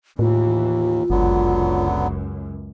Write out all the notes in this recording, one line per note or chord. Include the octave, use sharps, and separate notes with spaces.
D#2 A2 E3 F4
G1 C#2 F#2 D3 F#3 B3